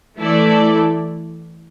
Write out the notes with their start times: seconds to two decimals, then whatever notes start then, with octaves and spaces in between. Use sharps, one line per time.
0.18 E3 A3 E4 A4 D5